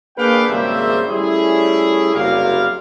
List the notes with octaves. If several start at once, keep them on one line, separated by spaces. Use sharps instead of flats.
A#3 D4 G#4 B4 F5 G5
G#1 C#3 G3 A#3 C5 E5
G3 A3 C#4 E4 G#4
F#1 C2 G3 F#4 A#4 F5